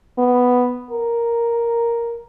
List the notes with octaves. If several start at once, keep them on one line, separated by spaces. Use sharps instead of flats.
B3
A#4